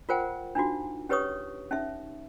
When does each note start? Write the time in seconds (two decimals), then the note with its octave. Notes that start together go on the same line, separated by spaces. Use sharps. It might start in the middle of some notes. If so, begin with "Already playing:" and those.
0.09 F4 A#4 C5 F#5 G5
0.55 D4 D#4 F4 F#4
1.09 C#4 G4 B4 C#5 C#6 D#6
1.71 C#4 D#4 E5